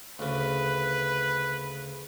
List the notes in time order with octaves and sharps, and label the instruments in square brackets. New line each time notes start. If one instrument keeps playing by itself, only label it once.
[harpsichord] D2 C#3 [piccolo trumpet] B4